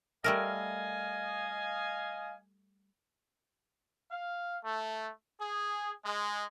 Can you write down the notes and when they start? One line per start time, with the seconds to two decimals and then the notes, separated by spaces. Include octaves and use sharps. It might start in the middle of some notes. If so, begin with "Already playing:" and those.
0.24 G3 A3 A#4 D#5 F5 G#5
4.10 F5
4.63 A3
5.41 G#4
6.05 G#3